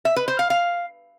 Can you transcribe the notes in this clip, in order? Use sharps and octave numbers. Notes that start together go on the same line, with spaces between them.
E5
B4
C5
F5
F5